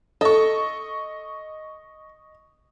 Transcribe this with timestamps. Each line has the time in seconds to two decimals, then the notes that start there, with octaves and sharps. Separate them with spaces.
0.21 A4 D#5 C#6